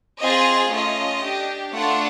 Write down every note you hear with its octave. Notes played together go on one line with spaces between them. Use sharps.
C4 F4 G#4 D#5
A3 C#4 F4 D#5
D4 G4
A3 D4 F4 A4 F#5